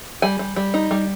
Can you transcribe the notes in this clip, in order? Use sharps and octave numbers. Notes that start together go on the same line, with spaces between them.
G3 G#5
G3
G3
D#4
G3